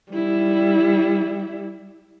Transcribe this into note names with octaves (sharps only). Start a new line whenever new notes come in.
G3 E4